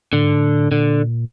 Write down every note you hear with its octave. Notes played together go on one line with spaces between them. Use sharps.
A2 D3
G#2
A2
A#2 D3